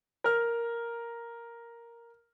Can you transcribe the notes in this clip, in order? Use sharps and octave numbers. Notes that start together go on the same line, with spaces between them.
A#4 F6